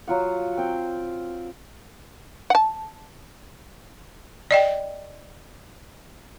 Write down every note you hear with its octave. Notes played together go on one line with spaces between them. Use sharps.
F#3 F4 F#5
C4 G5
F#5 A5
D5 D#5 G5